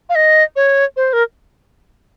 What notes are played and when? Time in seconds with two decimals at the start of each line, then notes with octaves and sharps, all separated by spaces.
0.09 F5
0.15 D#5
0.56 C#5
0.97 C5
1.13 A#4